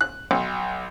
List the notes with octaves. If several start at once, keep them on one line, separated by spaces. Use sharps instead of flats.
F#6
B1